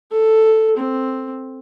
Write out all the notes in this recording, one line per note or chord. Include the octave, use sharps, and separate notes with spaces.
A4
C4